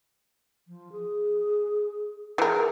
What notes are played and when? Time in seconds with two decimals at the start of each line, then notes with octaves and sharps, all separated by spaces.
0.67 F3
0.92 G#4
2.38 E3 G#4 A#4